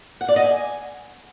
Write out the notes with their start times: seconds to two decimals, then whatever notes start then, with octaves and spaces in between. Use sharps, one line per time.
0.21 F#5
0.28 D5
0.36 D#5
0.44 G#5